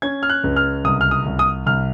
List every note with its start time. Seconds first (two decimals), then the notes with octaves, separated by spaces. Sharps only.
0.02 C#4 G#6
0.23 F6
0.29 F#6
0.44 C#2
0.56 F6
0.84 C2 D#6
1.01 F6
1.11 D#6
1.25 C2
1.39 D#6
1.66 C2 F6